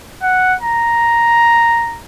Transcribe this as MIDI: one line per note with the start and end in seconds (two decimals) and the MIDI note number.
0.23 0.56 78
0.62 2.01 82